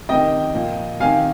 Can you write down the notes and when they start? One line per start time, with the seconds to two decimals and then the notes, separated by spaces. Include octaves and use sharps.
0.09 C3 D#3 D#5 G5
0.54 A#2 F3
1.00 C3 D#3 F5 G#5